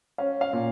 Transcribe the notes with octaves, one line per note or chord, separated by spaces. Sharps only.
C#4 F5
F5
A#2